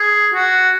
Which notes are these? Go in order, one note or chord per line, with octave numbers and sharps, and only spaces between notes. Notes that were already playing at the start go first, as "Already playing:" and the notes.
Already playing: G#4
F#4